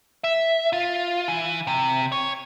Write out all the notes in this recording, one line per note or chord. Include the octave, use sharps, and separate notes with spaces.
E5
F4
E3
C3
C#5